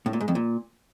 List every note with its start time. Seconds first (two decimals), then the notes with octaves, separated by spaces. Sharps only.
0.06 A2
0.13 A#2
0.21 G#2
0.28 F2
0.35 A#2